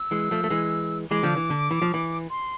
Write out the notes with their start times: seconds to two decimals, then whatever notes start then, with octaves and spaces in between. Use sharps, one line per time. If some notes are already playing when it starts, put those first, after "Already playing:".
Already playing: E6
0.11 E3 G#3
0.31 F3 A3
0.44 A3
0.50 E3 G#3
1.10 E3 G#3 D6
1.23 D3 F3
1.36 E3
1.50 D3
1.71 E3
1.82 F3
1.94 E3
2.30 C6